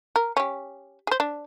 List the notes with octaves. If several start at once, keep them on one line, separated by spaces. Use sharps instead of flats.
A#4
C#4 G4
G#4 C5
D4